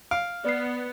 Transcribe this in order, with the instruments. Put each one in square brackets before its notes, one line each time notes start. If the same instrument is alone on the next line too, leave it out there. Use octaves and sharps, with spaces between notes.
[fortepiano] F5 [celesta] D7
[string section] B3 [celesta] D5 C7